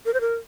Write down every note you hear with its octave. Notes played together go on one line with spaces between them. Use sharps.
A#4
C5
A#4